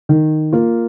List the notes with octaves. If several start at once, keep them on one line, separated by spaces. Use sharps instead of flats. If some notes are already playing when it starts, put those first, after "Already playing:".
D#3
A#3 F4